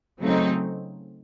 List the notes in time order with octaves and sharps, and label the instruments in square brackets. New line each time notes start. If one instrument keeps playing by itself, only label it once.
[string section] C#3 F#3 A3 C4 D#4